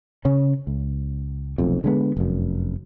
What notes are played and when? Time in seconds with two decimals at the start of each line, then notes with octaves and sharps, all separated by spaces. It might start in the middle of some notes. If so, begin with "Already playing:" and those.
0.25 C#3 C#4
0.67 C#2
1.58 F1 B1 F2
1.84 D3 G#3 B3
2.17 F1 F#2